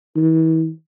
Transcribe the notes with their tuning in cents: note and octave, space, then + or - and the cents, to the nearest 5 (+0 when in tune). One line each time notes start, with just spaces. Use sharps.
E3 -40